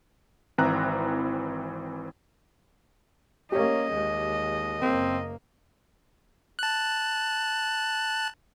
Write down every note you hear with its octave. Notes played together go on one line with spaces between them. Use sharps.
G#1 E3 C4 E4 A#5 F#6
A#3 C#4 G4 C#5 D#5
D#2 G#3
F#1 A#3 C4
A5 F#6